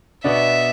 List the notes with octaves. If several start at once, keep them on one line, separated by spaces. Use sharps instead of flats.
B2 B3 D4 E5